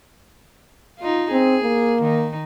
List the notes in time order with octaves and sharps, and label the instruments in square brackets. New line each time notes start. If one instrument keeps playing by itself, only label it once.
[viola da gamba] D#4 F4
[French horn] C4 [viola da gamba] G#4
[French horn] A#3
[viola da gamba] D#3 D#4